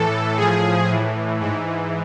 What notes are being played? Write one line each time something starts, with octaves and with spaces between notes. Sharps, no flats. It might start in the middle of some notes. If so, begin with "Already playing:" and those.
Already playing: A2 E3 A4
A2 F3 G#4
A2 E3
G#2 E3